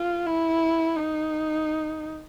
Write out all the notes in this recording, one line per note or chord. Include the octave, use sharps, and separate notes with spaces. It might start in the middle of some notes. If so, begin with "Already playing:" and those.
Already playing: F4
E4
D#4